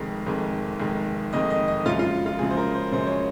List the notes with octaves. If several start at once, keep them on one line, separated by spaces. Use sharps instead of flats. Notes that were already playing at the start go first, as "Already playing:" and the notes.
Already playing: F1 F2 D#3 G#3
F1 F2 D#3 G#3
F1 F2 D#3 G#3
F1 F2 D#3 G#3 D#5
D#5
D#5
F#2 C#3 F3 G#3 F4
F4
F4
F#2 C#3 F3 G#3 G#4
C5
A#4
C5
F#2 C#3 F3 G#3 C5
C#5